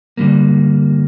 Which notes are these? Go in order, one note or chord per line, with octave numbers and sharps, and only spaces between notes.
G2 D3 G3 A#3